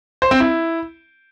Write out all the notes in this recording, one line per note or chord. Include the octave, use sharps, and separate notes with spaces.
C5
C4
E4